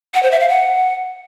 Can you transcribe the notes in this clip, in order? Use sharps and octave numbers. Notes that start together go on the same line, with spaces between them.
F#5
C5
E5
F5
F#5